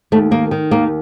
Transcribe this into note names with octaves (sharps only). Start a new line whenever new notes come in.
D#2 A3
D#3 A#3
D#3
D#2 A#3